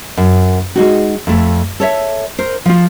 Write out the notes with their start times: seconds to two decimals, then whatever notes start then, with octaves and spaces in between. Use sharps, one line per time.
0.17 F#2
0.76 G#3 D#4 F#4
1.27 F2 A3
1.80 A4 C#5 E5
2.39 A#4 C5
2.65 F3 F4